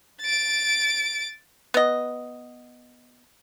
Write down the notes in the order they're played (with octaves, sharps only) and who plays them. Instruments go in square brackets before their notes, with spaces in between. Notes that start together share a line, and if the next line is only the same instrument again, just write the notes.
[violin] A6 D7
[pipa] B3 D#5